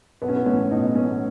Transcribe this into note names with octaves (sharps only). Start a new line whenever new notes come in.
B1 B3
C#4
B3
A2 E3 C#4
B1 D#4
A2 E3 C#4